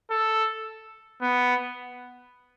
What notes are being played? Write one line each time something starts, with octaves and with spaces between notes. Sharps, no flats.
A4
B3